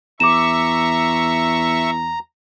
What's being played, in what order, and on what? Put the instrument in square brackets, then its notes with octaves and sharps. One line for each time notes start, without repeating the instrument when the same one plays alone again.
[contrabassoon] E2 [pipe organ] E5 C#6 [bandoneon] A#5 [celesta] D6 E7